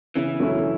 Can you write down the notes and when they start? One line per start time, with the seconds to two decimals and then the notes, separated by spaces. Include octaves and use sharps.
0.16 C#3 E3
0.40 F#3 A3 C#4 E4